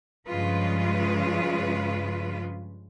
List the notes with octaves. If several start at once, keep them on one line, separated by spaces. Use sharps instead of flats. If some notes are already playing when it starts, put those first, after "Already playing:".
G2 C#3 F3 G#3 F4 B4